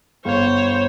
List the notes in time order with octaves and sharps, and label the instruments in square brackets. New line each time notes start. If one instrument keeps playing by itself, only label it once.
[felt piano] G1 F5 [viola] C5 C#5